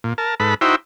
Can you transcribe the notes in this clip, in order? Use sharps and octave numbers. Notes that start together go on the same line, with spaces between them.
A#2
A#4 A5
G#2 A4 B4 B5
D#4 E4 F#4 C5 E5 G5